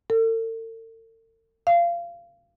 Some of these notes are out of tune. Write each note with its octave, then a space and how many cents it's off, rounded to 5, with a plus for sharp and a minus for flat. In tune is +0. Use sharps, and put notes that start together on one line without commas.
A4 +45
F5 -25